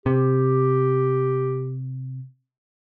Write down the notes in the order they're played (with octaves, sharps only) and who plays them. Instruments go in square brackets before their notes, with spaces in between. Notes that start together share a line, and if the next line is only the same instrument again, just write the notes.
[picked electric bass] C3 [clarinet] G4